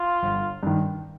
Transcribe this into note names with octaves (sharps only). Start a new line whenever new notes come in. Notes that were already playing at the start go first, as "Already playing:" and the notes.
Already playing: F4
G1
G2 D#3